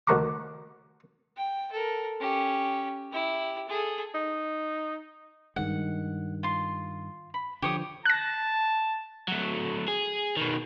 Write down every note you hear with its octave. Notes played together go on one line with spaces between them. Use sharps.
D2 D#3 F#4 A#5 D6
G5
A4 A#4
C#4 G4
E4 G4
G#4 A4
D#4
G2 D#3 G#3 F#5
F4 C6
B5
D3 F3 G4 C#5 D#6
A5 F#6 A#6
F#3 A3
G#4
B2 D#3